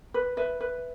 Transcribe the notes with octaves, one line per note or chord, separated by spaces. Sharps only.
B4
B4 E5
B4